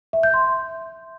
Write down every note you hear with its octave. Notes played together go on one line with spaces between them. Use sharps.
E5
G6
C6